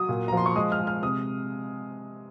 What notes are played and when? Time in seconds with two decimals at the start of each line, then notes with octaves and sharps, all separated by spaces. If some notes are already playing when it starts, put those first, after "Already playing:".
Already playing: F#3 D#6
0.09 A#2
0.28 A#5
0.32 F3 C6
0.46 C#6
0.56 G#3 D#6
0.72 F6
0.79 G#3
0.87 F6
1.03 C3 D#6